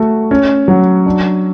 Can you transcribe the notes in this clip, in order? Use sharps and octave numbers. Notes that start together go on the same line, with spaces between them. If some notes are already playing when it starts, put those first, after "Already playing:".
Already playing: A3 F#4
C#4
F#3
D4